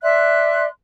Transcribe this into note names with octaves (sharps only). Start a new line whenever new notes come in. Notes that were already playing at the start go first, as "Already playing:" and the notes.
D5 E5 C6 F#6